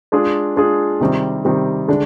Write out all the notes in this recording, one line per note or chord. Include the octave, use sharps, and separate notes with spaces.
G#3 D4 F4 G#4
G#3 D4 F4 G#4
C3 D#3 G3 C4
C3 D#3 G3 C4
D3 G#3 D4